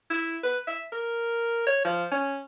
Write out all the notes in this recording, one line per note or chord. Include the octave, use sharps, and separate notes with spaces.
E4
B4
E5
A#4
C#5
F3
C#4